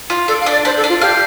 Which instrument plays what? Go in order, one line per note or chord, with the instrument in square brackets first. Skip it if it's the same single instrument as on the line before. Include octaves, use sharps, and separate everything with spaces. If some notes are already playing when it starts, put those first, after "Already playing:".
[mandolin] F4
[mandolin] D4 [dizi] A4
[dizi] F5
[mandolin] D4
[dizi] D5
[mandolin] D4 [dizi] C5
[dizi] A4
[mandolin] D4
[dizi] F4
[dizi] G4 [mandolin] F5